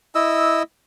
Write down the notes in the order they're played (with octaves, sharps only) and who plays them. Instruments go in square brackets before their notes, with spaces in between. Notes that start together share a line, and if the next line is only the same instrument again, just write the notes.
[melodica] E4 D#5 E6